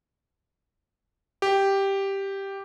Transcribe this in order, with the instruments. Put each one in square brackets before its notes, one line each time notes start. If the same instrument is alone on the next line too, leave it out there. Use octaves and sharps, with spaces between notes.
[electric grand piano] G4